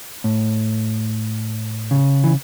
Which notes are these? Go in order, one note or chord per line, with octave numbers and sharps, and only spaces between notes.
A2
C#3
E3